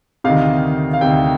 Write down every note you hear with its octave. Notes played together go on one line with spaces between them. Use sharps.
D2 C3 D#3 F5
F5
D2 C3 D#3 G5